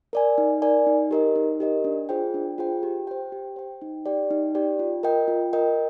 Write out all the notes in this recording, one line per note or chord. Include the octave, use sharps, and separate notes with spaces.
A#4 D5 G#5
D#4
A#4 D5 G#5
D#4
G4 A#4 D#5
D#4
G4 A#4 D#5
D4
F4 G#4 C5 G5
D4
F4 G#4 C5 G5
G4
C5 G5
G4
C5 G5
D#4
G4 D5 G5
D#4
G4 D5 G5
F4
A#4 D#5 G5
F4
A#4 D#5 G5